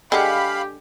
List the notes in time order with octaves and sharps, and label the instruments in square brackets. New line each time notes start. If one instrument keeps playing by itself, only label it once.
[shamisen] D3 G#3 [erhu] G4 [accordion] F5 B5 [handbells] G5 G#5